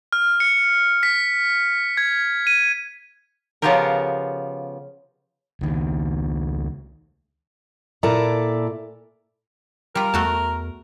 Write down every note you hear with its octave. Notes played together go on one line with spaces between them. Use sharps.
F6
C#7
B6
G#6
D#7
C#3 F3 B3 F4 G4 A#4
C#2 D#3
A#2 E4 A4 D5 A#5
G3 F4 A#4
E2 A3 F#4 A5